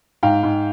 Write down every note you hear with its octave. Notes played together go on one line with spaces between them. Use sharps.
G#2 F5 G5
G#2